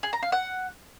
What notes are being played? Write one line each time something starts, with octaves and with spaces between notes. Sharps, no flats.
G#4
A#5
F5
F#5